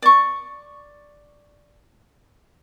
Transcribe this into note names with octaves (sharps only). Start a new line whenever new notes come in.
D5 C#6